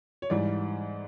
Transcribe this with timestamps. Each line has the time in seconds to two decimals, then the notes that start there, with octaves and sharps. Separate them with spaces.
0.22 C#5
0.30 G#2 E3 G3 D5